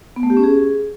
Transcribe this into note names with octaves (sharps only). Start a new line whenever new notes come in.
B3
A3
G4
C#4
G#4